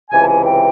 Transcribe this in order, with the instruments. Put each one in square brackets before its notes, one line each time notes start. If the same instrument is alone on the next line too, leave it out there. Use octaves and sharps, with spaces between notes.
[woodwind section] C#2 C3 E3 G#5
A5
G#5
G5